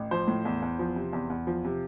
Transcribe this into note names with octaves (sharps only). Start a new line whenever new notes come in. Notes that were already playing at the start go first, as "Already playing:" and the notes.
Already playing: A1
F3 C5
A2
E2
E2
F3
C3
E2
E2
F3
C3